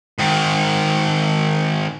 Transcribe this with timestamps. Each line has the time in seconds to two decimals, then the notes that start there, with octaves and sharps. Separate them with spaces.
0.19 G#2 D#3